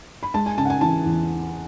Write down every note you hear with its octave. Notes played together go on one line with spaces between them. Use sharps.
B5
G#3 A5
G#5
C#3 A5
F#5
G#5
E3 A5
E2